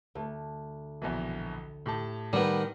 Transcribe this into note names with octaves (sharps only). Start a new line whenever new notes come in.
D2
A#1 B2 E3
A2 G4 A5
D#3 G3 B3